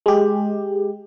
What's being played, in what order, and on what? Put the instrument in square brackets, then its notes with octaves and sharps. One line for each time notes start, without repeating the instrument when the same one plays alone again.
[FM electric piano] G#3 G4